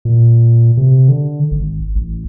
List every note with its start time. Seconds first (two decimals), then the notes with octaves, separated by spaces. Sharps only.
0.05 A#2
0.77 C3
1.08 D3
1.51 G#1
1.95 A1